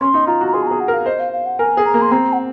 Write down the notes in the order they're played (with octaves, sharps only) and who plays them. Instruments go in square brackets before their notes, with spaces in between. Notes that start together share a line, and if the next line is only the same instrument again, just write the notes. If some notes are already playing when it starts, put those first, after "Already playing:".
[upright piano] C#4 [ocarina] C6
[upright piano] D#4
[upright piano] F4 [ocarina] A#5
[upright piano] F#4
[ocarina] A#5
[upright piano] G#4 [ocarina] C6
[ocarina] G#5
[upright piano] G#4 [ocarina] A#5
[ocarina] F#5
[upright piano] A#4
[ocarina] F5
[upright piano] C5 [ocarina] D#5
[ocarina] F5
F5
F#5
[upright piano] A#4 [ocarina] G#5
[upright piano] G#4
[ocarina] A#5
[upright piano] A#3
[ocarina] C6
[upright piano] C4 [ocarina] A#5
[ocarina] F#5